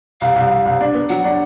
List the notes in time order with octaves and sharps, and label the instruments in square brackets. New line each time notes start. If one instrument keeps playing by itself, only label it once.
[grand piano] C2 [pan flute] F5
[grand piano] C2
C2
C2
D4
B3
[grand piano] F#3 [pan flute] F#5
[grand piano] D4